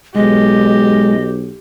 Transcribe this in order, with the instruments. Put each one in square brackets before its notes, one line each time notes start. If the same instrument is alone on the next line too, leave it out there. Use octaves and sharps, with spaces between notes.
[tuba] B1 [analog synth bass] G#3 [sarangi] G4 [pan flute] D#5